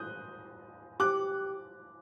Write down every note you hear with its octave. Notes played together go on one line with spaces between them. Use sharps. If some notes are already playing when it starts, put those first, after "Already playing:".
Already playing: D#6 F#6 G6
G4 D6 F#6